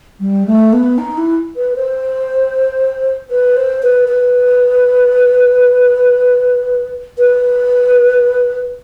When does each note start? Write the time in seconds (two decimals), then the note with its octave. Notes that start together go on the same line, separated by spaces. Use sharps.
0.19 G3
0.46 A3
0.72 B3
0.97 D#4
1.17 E4
1.56 B4
1.75 C5
3.30 B4
3.56 C5
3.82 B4
4.08 B4
7.18 B4